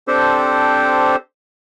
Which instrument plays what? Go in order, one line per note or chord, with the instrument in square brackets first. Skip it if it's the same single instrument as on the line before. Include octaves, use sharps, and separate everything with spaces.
[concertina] C4 D4 G4 A4 C5